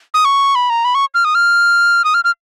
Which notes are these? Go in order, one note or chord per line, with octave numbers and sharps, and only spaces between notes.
D#6
C#6
B5
A#5
B5
C#6
F6
D#6
F6
D#6
F6
F6